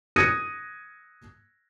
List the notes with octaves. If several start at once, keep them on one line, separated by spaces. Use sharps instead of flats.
D#6 F#6 G#6 A#6 C#7 D#7